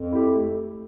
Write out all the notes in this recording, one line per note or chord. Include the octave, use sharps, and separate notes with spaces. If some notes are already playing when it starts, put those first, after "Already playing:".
Already playing: F2
E4 G4
A3